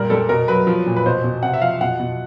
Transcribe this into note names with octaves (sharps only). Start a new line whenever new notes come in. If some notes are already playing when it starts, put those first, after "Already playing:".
Already playing: A#2 G3 A#4
G3 A4
B2 A#4
F#3 B4
F3
A#2
B4
B2 C5
B2
C3 F#5
E5
F3 F5
B2 F#5
B2